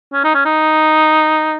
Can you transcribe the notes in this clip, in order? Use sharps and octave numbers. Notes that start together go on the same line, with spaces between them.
C#4
D#4
C#4
D#4